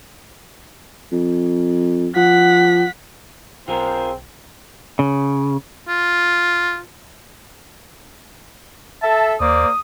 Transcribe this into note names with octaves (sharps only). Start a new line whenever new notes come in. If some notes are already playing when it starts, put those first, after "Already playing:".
F2
F3 F#5 B6
B1 C4 F4 G#4 A#4 C5
C#3
F4
A4 E5 A5
D#2 A#3 C5 D5 D#6